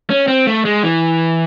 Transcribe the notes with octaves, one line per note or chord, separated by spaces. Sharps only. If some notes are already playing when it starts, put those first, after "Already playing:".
C#4
C4
A3
G#3
E3